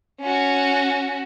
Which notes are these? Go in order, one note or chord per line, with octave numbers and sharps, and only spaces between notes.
C#4 F#4